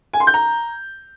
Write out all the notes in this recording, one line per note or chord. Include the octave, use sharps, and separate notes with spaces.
G#5
C6
G6
A#5